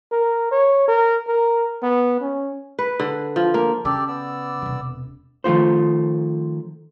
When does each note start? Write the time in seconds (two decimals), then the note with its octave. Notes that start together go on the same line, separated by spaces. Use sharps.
0.12 A#4
0.51 C#5
0.88 A#4
1.28 A#4
1.82 B3
2.21 C#4
2.79 B4
3.00 D3
3.36 F3
3.54 A#3
3.85 C#3 G4 A4 D5
4.08 B3 D5 E6
4.62 E1 C3
5.44 D#3 F3 A3 F4 C5